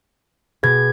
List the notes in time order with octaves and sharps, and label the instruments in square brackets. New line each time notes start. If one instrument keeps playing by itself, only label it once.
[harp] B2 A6 [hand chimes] G#4 G#6